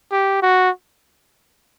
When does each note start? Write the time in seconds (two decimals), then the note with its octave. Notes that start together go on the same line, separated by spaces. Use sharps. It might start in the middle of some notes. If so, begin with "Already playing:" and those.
0.12 G4
0.42 F#4